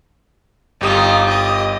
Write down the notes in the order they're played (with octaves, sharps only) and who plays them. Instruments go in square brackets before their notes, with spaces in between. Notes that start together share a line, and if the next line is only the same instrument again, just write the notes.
[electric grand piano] G1 G4 D#6 [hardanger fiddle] D#4 F4
[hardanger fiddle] D#5